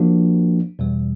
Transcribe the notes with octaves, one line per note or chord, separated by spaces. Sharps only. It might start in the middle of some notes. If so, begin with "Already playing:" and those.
Already playing: F3 A#3 D4 F#4
E2 B2 G3